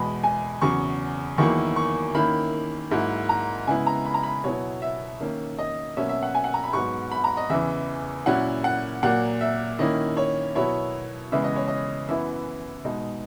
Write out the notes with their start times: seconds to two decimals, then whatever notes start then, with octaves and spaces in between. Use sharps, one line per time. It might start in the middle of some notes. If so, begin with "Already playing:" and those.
Already playing: E2 B2 G#3 B5
0.23 G#5
0.61 E2 C#3 F#3 C#6
1.38 E2 D#3 F#3 A#3 E4 C#6
1.76 C#6
2.15 D#3 A#3 C#4 E4 B5
2.91 G#2 F#3 A#3 E4
3.29 A#5
3.67 C#3 G#3 B3 E4 G#5
3.87 A#5
4.05 B5
4.14 A#5
4.23 B5
4.44 B2 F#3 B3 E4 C#5
4.82 E5
5.20 D#3 A#3 C#4
5.59 D#5
5.97 B2 F#3 A#3 C#4 E5
6.09 E5
6.23 F#5
6.35 G#5
6.44 F#5
6.54 A#5
6.64 B5
6.73 G#2 F#3 B3 C#6
7.12 B5
7.24 A#5
7.37 D#5
7.50 E2 C#3 E3 E5
8.26 A#2 F#3 C#4 E4 F#5
8.64 F#5
9.03 A#2 F#3 A#3 F#5
9.41 E5
9.79 D#3 A#3 C#4 E4 D#5
10.17 C#5
10.55 B2 F#3 B3 E4 C#5
11.32 C#3 E3 G#3 B3 E5
11.44 D#5
11.56 C#5
11.68 D#5
12.08 F#2 E3 B3 E4 E5
12.85 B2 G#3 D#4